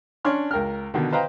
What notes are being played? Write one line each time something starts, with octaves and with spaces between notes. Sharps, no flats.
C#4 D4 C#5 C6 F6
C#2 A#4 G5 F6
B2 D3 D#3
B4 C5 D#5 F5 G5 A#5